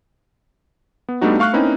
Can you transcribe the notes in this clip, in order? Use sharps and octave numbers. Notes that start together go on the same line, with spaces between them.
B3
G3 A3 B3 D4 D#4 F#4
A3 F5 C#6 F6 F#6
A#3 C4 C#4 D#4 E4 B4